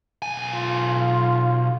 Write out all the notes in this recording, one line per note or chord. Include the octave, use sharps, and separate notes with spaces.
B1 G#5
F4